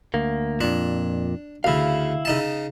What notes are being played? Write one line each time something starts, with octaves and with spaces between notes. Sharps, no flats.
D2 A#3
F2 A#2 D4
D2 C#3 E4 F5
C#3 D#4 A5